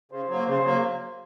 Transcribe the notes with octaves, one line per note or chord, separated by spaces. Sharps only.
C#3 C5
F#3 A#3
C#3 C5
F#3 A#3